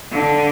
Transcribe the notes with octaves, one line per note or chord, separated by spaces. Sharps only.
D3